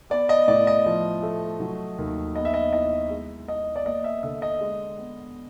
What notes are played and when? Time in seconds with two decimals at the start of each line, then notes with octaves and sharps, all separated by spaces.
0.10 B3 D5
0.29 D#5
0.48 A2 D5
0.67 D#5
0.86 F3
1.22 A3
1.60 F#3
1.98 D#2
2.36 B3 D#5
2.45 E5
2.54 D#5
2.73 E4 D#5
3.10 G#3
3.48 B3 D#5
3.76 D5
3.86 A#3 D#5
4.04 E5
4.23 D3 E5
4.42 D#5
4.61 G#3
4.98 B3